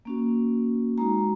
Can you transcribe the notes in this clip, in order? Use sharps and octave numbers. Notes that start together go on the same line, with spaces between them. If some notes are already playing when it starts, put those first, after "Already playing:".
A#3 C#4 F#4
G#3 D#4 F#4 A#5